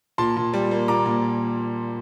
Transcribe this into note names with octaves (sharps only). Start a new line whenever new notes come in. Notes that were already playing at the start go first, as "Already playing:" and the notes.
A#2 A5 C6
A#2
G3
A#3
A#2 A#5 D6
A#2